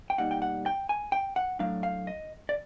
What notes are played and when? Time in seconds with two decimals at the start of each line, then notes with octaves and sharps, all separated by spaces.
0.10 G5
0.18 B2 G3 A#3 D#4 F#5
0.31 G5
0.42 F#5
0.66 G5
0.89 G#5
1.12 G5
1.36 F#5
1.59 A2 F#3 A3 D4 F5
1.83 F5
2.07 D#5
2.49 D5